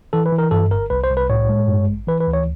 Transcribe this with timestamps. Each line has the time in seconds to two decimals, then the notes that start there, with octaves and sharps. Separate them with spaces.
0.13 E3 A4
0.26 B4
0.32 E3
0.38 A#4
0.51 G2 A4
0.71 G1 A#4
0.90 C2 B4
1.04 C5
1.10 C2
1.17 B4
1.29 A2 C#5
1.49 G#3
1.68 G2
1.88 A1
2.07 E3 B4
2.20 B4
2.27 D2
2.34 C#5